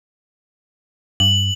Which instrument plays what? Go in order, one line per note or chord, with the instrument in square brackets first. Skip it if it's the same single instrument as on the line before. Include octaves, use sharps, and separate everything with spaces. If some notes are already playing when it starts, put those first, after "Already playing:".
[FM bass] G2 [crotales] F#7